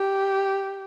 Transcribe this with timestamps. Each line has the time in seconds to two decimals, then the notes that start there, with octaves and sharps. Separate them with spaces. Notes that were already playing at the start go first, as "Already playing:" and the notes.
Already playing: G4